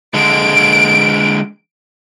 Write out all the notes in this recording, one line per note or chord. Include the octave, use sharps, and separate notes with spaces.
D3 G#3 D7